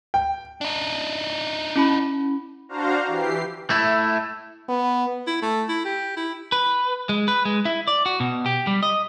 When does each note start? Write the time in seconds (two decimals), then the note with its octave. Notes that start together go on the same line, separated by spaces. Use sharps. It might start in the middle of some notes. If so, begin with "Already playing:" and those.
0.14 G5
0.61 D4 D#4
1.76 C#4 E4 B5
2.69 D4 F#4 C5 F5 A#5
3.07 E3 G4 C7
3.70 A3 E4
4.69 B3
5.27 E4
5.42 A3
5.69 E4
5.85 G4
6.16 E4
6.52 B4
7.09 G#3
7.28 B4
7.45 G#3
7.65 E4
7.88 D5
8.06 F#4
8.20 B2
8.46 G4
8.67 G3
8.83 D#5